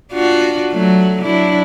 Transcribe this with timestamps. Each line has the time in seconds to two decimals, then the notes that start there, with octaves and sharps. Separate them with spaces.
0.12 D4 F4 F#4
0.72 F#3 A3
1.23 F#3 D4 E4